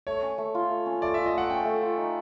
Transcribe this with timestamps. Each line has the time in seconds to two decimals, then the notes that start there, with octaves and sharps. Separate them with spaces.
0.07 A3 C#5
0.22 C#4
0.38 A3
0.55 F4
0.70 A3
0.86 C#4
1.02 A3 D5
1.14 F4 E5
1.26 D#5
1.34 A3 F#5
1.50 C#4 G5
1.65 A3
1.82 F4
1.97 D#4